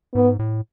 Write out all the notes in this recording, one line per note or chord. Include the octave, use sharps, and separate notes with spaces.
G#2 B3
A2